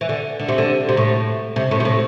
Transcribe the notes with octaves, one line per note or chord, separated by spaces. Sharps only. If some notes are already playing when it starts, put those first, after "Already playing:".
E3
D3
D3
C3
D3
C3
A2
C3
A2
C3
A2